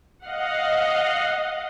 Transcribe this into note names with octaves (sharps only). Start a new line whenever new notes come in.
D#5 F5 F#5